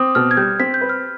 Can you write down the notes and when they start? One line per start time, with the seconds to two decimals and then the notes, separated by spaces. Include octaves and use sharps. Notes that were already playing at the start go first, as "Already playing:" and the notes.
Already playing: C4 D6 D#6
0.15 B2 F6
0.31 G#6
0.37 G3 G6
0.60 C4 B6
0.74 G6
0.81 B4
0.89 F6